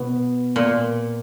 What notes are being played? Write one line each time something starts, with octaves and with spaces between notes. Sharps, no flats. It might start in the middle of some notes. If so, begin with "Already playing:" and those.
Already playing: B2
A#2